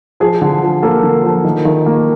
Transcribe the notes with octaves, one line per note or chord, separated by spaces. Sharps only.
F3 G#4
D3
F3
A#3 A4
D3
F3
D#3
D#3
A#3